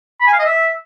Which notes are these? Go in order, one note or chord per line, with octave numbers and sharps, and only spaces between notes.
B5
G#5
F5
D#5
E5